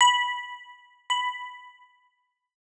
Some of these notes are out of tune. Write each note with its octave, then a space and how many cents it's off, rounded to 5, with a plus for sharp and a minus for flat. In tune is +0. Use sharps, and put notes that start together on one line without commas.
B5 -10
B5 +5